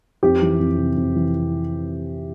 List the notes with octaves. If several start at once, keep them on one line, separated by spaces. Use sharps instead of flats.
F2 G4
E3
F2
C3
F2
E3